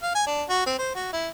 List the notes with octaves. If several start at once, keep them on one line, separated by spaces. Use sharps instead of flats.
F5
G#5
D4
F#4
C4
C5
F#4
E4